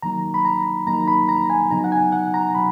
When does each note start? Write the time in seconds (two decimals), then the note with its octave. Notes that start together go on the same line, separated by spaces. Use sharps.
0.02 F2 D#3 F#3 A#3 D#4 A#5
0.34 B5
0.45 A#5
0.87 F2 D#3 F#3 A#3 D#4 A#5
1.08 B5
1.29 A#5
1.50 G#5
1.71 F2 C#3 F#3 B3 D#4 A#5
1.84 F#5
1.92 G#5
2.12 F#5
2.34 A#5
2.55 C#3 F#3 B5